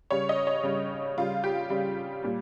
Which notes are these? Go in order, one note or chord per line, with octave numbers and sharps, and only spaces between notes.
C#3 G3 C#5
D#5
C#5
C#3 G3
C#3 G3 F4
G4
C#3 G3
A#2 G3